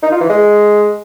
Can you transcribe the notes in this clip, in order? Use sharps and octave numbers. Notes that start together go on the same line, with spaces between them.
D#4
F4
E3
G#3